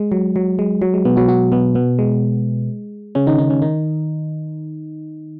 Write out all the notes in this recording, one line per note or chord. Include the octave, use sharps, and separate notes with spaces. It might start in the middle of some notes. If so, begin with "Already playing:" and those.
Already playing: G#3
F#3
F#3
G#3
F#3
G#3
B2 B3
F#3 F#4
F#3 F#4
B2 B3
B2 B3
G#3
C#3 C#4
D#3 D#4
D#3 D#4
C#3 C#4
D#3 D#4